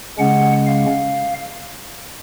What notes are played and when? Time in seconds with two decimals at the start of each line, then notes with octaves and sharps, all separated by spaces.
0.19 C#3 G#3 C#4 F#5
0.67 F5